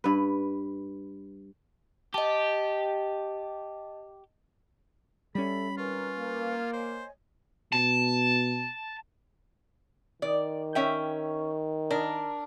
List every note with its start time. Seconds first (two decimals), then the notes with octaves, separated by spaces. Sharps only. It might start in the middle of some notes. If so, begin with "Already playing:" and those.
0.04 G2 B4
2.14 G4 D#5 A5
5.35 G3 C#4 A4 D5 E5 B5
5.78 G#1 F4 A#4 B4 G#5 C#6
6.17 A#3
6.73 C5 C#5 D#5 G#5
7.72 B2 A5
10.22 D#3 D5
10.75 C#4 E5 G5
11.90 D4 A#4